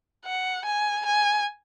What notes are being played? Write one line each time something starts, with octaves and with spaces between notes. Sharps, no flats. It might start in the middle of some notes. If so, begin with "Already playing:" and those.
F#5
G#5
G#5